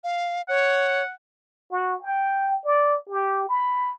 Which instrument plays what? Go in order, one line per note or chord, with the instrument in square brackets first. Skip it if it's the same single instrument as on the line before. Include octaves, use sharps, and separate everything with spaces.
[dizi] F5
[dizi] C#5 [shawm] F#5
[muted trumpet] F#4
G5
D5
G4
B5